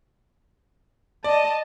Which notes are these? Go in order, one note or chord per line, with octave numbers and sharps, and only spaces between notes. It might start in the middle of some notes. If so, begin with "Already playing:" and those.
D5 D#5 A5